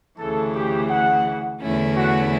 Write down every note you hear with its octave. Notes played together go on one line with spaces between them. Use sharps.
D2 C#3 E3 A4
G4
F#5
E2 D3 A3 C#4 E4
F#4